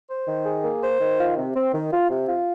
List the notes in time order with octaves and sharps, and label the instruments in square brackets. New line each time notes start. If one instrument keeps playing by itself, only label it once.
[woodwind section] C5
D#3
G#4
A#3
C5
D#3
F4
C3
C4
D#3
F4
C3
F4